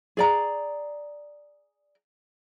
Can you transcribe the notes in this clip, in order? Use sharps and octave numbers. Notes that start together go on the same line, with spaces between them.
G#4 D5 A#5